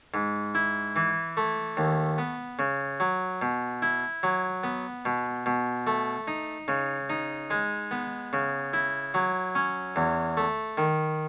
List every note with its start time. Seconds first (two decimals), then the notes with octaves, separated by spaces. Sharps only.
0.14 G#2
0.55 E4
0.96 E3
1.37 A3
1.77 D#2
2.18 B3
2.59 C#3
3.00 F#3
3.42 B2
3.82 E4
4.23 F#3
4.63 B3
5.05 B2
5.46 B2
5.87 A3
6.28 D#4
6.68 C#3
7.10 D#4
7.50 G#3
7.91 B3
8.33 C#3
8.73 E4
9.14 F#3
9.55 C#4
9.96 E2
10.37 A3
10.78 D#3